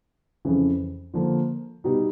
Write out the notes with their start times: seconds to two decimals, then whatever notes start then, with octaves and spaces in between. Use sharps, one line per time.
0.45 F2 C#3 E3
1.14 D3 F3 A#3
1.84 B2 G3 B3 D#4 F#4